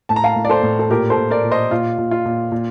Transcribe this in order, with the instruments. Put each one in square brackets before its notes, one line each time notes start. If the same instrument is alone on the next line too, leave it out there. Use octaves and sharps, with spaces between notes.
[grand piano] A2 A5
A#5
F5 A5
A2
D5
A4 C5
A2
A4
A#2 G4 A#4
A4 C5
A#2
A#4 D5
A#2
C5 D#5
A#2 F4
A#2
F4
A#2
A#2